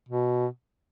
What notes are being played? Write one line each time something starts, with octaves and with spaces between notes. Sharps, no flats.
B2